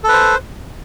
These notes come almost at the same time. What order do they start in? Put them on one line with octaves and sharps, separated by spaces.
A4 B4 C5